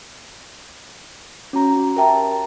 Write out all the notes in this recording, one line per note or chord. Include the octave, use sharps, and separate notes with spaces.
C#4 F#4 A#5
G4 A#4 E5 G5 A5 A#5